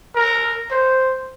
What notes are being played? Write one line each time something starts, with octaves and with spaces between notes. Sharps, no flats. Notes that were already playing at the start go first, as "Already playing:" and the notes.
A#4
C5